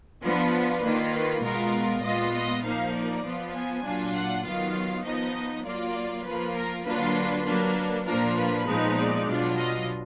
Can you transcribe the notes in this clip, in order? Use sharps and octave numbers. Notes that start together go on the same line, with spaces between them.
F3 B3 D4 F4 B4
D#3 A#3 F4
B4
B2 G#3 B3 F4 A#4
A#2 G#3 B3 F4 D#5
D#5
F3 A#3 D#4 F5
D5
F3 B3 F4
G#5
A#2 F#3 D4 F4
F#5
D#3 F#3 B3 F4 F5
F3 B3 D#4 D#5
F#3 A#3 F4 D5
F3 A#3 F4 B4
A#4
D3 F#3 A#3 D4 F4 B4
F#3 A#3 D4
A#2 F3 A#3 D4 F4 A#4
B4
A#2 F3 G#3 B3 D#4
D5
B2 F#3 D4 F4
D#5